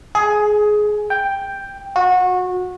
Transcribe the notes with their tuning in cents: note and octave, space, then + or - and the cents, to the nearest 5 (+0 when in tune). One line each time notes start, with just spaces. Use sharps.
G#4 +15
G5 +5
F#4 -25